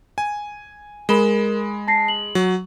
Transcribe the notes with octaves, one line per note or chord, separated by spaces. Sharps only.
G#5
G#3 A#4 B5 E7 G7
A5 A#6 C7
F#7
F#3